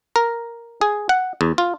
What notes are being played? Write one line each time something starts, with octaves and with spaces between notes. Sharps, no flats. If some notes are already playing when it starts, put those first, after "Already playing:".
A#4
G#4
F#5
E2
F4